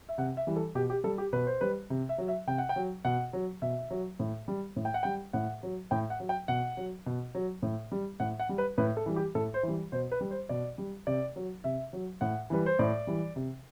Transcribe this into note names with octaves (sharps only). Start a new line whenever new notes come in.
E5
C3 F#5
E5
E3 G3
A4
B2 G4
G4
G3 A4
G4
B2 B4
C5
G3 B4
C3
E5
F#3
E5
C3 G5
F#5
G5
F#3
B2 F#5
F#3
B2 E5
F#3
A2
G3
A2
G5
F#5
G3 G5
A2 F#5
F#3
A2 G5
F#5
F#3
G5
B2 F#5
F#3
B2
F#3
A2
G3
A2 F#5
F#5
G3
B4
A2 B4
A4
E3 G3
G4
A2 A4
C5
E3 G3
B2 C5
B4
G3
C5
B2 D5
G3
C3 D5
F#3
C3 E5
F#3
A2 F#5
E3 G3 B4
C5
A2 D5
E3 G3
C3